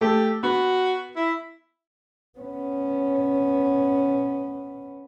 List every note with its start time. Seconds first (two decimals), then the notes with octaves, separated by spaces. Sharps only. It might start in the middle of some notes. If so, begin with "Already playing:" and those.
0.01 A3 G4
0.43 B3 F#4
1.16 E4
2.39 B3 C#4